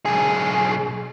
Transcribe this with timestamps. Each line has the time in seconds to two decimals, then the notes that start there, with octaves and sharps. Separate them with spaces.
0.06 B1 G#4